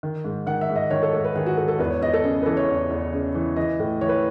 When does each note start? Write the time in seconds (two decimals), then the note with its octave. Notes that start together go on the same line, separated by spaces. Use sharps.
0.03 D#3
0.24 G#2
0.47 D#3 F#5
0.61 E5
0.70 G#2
0.76 D#5
0.91 D#3 C#5
1.03 A4
1.13 G#2 A4
1.24 B4
1.36 D#3 G#4
1.46 F#4
1.57 G#2 A4
1.68 A4
1.79 E2 B4
1.90 C#5
2.01 E2 D#5
2.14 A4
2.24 C#3 G#4
2.42 B4
2.46 E3 A4
2.57 C#5
2.69 E2
2.91 E2
3.13 C#3
3.35 E3
3.56 E3 D#5
3.79 A2
4.01 E3 C#5
4.09 B4